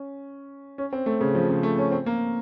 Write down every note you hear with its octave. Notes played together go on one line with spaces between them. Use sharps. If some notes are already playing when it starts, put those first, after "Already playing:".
Already playing: C#4
C#4
C4
A3
C#3
F3
C#3
A3
C#4
C4
A#3